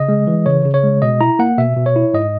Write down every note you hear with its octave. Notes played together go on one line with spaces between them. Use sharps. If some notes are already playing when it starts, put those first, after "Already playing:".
Already playing: C#3 D#5
G#3
E3
C#3 C#5
C#3
C#5
G#3
B2 D#5
E4 A#5
A#3 F#5
B2 E5
B2
C#5
E4
G#2 D#5